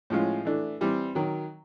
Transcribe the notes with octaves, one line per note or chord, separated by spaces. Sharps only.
A2 F3 G#3 C#4 F4
E3 A3 D4
E3 G3 C4
D#3 F#3